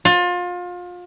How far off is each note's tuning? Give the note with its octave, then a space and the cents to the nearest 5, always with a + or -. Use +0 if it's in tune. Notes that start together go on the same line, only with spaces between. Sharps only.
F4 +30